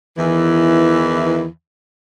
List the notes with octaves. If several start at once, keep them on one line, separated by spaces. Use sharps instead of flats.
E2 D#3 E3